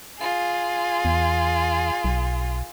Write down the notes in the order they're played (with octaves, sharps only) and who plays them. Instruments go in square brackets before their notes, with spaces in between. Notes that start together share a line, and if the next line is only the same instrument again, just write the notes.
[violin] F4 G#4
[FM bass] E2
B1